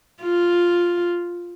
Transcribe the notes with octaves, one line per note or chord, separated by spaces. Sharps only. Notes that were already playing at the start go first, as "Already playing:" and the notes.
F4